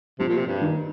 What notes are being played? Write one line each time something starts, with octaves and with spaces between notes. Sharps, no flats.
C3 F3
A#2
C3
G2
D#3